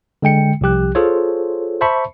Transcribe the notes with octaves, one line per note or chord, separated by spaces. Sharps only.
D3 G#3 G5 C#7
C2 F3 G4 F#6
F4 G#4 A4 C5 C#5
C5 E5 A5 B5 C#6